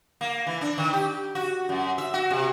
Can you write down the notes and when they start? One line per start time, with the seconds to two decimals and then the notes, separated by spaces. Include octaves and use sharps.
0.21 A#3
0.47 E3
0.61 D4
0.78 D#3
0.93 G4
1.35 F#4
1.69 F#2
1.98 E5
2.14 F#4
2.30 C3